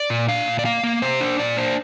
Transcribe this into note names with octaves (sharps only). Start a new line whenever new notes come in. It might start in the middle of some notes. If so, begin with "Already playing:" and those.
Already playing: D5
A#2
D4 F5
A#2
D5
A#3 F5
A#3
C3 C5
D4
A#2 D5
D4 C5